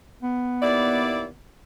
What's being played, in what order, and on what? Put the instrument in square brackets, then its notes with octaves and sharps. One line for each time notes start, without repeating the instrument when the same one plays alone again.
[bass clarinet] B3
[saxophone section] D#2 E4 D5